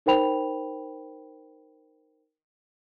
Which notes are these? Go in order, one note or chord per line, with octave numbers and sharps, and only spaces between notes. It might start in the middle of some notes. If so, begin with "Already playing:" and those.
D#4 A#4 C5 G5 B5 F7